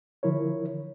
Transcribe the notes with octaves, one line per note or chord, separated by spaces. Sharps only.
D3 F3 E4 A#4 C#5